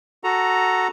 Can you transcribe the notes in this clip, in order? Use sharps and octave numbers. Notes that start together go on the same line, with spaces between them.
F#4 A4 A#5